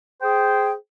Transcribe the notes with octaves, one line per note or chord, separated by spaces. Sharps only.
G#4 C5 G5